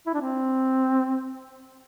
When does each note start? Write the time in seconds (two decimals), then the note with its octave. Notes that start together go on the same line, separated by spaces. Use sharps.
0.07 E4
0.14 D4
0.21 C4